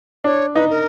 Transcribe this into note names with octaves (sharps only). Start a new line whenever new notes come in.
D4 C#5
D#4 B4
A#4